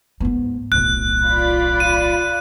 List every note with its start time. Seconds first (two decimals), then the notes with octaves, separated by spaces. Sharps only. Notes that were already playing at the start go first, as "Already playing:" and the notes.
0.20 G#2 B3
0.72 D1 B1 F#6
1.26 F4 D5 B5
1.80 D#7